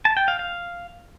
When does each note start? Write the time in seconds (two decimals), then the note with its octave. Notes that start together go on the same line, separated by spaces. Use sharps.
0.05 A5
0.17 G5
0.28 F5
0.39 F5